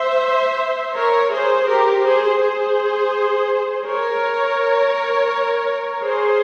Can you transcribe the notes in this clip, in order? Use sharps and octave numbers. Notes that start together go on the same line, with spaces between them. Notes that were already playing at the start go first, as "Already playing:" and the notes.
Already playing: C5 E5
A#4 C#5
G#4 C5
G4 A#4
G#4 C5
G#4 C5
A#4 C#5
G#4 C5